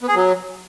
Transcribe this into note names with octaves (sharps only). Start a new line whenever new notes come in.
B3
G#4
F#3